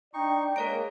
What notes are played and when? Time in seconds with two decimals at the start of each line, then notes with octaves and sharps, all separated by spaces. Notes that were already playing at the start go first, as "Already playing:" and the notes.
0.14 D4 D#4 D5 G5 C#6
0.56 G#3 A#3 A#4 C#5 A#5 D7